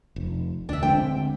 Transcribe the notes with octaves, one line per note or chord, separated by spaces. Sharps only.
F1
D2 D4 E5
D3 G#3 C4 G5